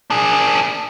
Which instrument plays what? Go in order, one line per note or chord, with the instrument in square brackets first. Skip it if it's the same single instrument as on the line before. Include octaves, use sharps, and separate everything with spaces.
[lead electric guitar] D4 G#4